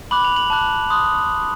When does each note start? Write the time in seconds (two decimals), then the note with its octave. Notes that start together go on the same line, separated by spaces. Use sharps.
0.11 B5 D6 F#6 F#7
0.24 F7
0.36 F#7
0.50 A5 D6 F#6
0.90 C6 D#6 F#6